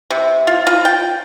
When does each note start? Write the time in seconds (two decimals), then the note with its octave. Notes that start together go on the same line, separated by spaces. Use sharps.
0.10 C3
0.47 F4
0.67 F4
0.85 G5